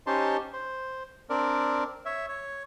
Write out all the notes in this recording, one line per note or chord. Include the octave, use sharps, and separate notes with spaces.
C#4 D#4 G4 C5 A5 C6
C5
C4 D4 A#4 D5
C#5 E5
C#5